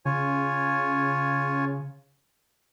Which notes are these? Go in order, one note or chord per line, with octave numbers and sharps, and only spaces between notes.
C#3 F4 C#5 G#5